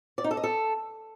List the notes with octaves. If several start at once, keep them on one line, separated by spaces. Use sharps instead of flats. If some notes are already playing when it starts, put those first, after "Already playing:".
D5
D#4
A4
D#5
A4